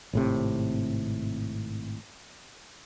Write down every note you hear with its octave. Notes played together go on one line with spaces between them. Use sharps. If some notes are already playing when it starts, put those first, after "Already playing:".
G#1 A2 C3